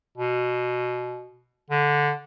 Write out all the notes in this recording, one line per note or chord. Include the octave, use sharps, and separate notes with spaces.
B2
D3